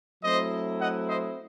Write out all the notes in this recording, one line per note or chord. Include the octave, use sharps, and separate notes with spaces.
F#3 A3 C4 E4 C5 D#5
D#5 F#5
C5 D#5